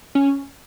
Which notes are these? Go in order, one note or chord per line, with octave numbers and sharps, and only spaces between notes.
C#4